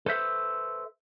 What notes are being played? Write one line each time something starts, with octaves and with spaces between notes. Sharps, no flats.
A4 B4 C5 E5